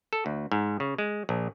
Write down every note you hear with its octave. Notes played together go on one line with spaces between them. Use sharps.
A4
D2
G#2
C#3
G#3
A#1